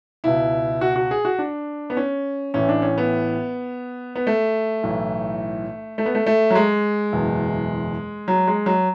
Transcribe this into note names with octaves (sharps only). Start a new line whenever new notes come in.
C#2 B2 E4
F#4
F#4
G#4
F#4
D4
B3
C#4
A1 A2 E3 C#4
D4
C#4
B3
B3
A3
B1 A2 E3
A3
B3
A3
A3
F#3
G#3
F#1 E2 B2
F#3
G#3
F#3